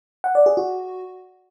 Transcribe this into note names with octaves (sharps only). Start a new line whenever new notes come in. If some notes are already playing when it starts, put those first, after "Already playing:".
F#5
D5
G#4
F#4